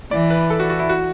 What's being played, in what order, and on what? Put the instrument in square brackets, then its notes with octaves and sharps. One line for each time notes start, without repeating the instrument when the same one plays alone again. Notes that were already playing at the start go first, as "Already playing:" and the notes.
[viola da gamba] E3 [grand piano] D5
[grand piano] B4
A4
F#4
F#4
E4
F#4